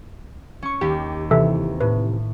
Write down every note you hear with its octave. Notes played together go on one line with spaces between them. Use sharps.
C#4 C#6
D#2 G4
C3 E3 A4 E5
A2 B4